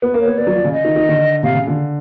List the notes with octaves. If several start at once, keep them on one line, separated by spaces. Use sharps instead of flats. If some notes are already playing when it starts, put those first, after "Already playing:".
B3
A#3
C#5
B3
B3 D5
F#3
F3
C#3
D#5
D#3
D#3
D3
C3 F5
C#3
D3